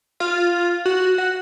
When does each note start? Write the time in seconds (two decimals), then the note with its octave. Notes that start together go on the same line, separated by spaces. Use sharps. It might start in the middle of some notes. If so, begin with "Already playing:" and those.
0.20 F4
0.85 F#4
1.18 F#4